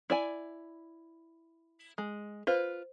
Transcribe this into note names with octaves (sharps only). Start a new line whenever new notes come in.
E4 D5 G#5
G#3
F4 B4 C5